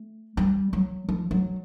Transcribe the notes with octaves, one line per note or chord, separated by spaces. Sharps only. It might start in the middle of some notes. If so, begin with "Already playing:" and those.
Already playing: A3
G3
F#3
F3
F#3